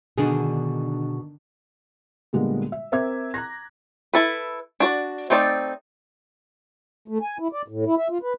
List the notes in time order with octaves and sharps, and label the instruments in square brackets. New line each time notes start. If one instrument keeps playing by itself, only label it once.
[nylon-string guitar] B2 G#4 [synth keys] D3 D#3 D4
[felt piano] A#2 D3 G3 G#3 A#3 B3
E5
C4 A#4 E5 D6 G#6
A#5 F#6 G#6 A#6
[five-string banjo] E4 A4 B4
D4 F#4 D5
A3 C4 D#4 D5 A5
[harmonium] A3
G#5
E4
D5
A2
E4
E5
F4
B4